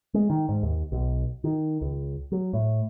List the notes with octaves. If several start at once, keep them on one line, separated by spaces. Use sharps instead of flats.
G#3
D#3
G#2
D#2
B1
D#3
C#2
F#3
A2